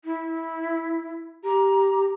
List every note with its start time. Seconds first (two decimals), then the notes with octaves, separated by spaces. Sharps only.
0.04 E4
1.44 G4 A#5